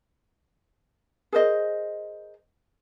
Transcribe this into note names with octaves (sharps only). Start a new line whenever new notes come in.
G#4 A#4 C5 D#5